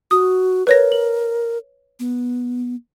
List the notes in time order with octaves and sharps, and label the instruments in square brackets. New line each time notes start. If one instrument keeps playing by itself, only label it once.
[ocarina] F#4 [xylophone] D#6
[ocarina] A#4 [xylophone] B4 C#5 A#6
[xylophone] F#7
[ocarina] B3